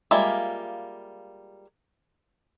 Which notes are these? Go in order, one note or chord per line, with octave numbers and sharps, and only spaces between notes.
G3 G#3 A#3 F4 E5